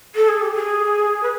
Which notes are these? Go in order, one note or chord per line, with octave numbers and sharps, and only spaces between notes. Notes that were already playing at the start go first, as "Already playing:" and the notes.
A4
G#4
G4
G#4
B4